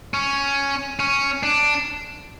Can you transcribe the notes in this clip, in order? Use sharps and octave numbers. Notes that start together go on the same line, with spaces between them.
C#4
C#4
D4